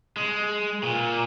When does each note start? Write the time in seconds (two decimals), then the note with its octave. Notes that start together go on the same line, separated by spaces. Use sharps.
0.16 G#3
0.83 A#2